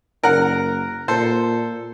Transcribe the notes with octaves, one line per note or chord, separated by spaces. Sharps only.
F#1 A#4 F#5
A#2 A4 C5